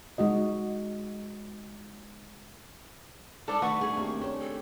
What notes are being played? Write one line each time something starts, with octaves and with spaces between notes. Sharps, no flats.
G#3 D#4 F#4 D#5
G#3 D4 D#4 A4 D6
D#3 G3 A3 F#4 B4 F#5 C#6
D4 G#4
A#3 C4 G4
A3 C#4 D4 C#5
A4